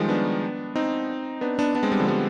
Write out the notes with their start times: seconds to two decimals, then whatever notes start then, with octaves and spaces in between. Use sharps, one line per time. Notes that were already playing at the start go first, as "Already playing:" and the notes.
Already playing: D#3 F3 G3 G#3
0.09 B3 D4
0.76 C4 D#4
1.41 B3 D4
1.59 B3 D4
1.75 B3 D4
1.83 G#3 C4
1.92 G3 B3
2.00 D3 F3
2.08 G3 B3